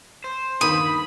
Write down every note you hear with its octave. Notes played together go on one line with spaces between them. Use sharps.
C5
G1 D#2 B5 D#6